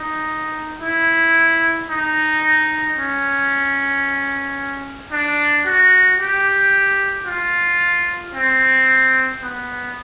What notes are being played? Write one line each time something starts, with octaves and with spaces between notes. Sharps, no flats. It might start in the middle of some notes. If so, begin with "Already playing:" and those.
Already playing: D#4
E4
D#4
C#4
D4
F#4
G4
F4
C4
B3